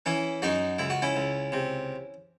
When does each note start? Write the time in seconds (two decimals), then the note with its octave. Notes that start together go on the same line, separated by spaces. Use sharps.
0.06 E3 C#4 E4
0.42 F#2 D#4 F#4
0.78 C#2 E4
0.90 F#4
1.02 C#4 E4
1.16 C#2
1.52 C3